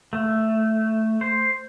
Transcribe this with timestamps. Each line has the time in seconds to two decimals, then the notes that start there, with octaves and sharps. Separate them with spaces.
0.13 A3
1.21 C5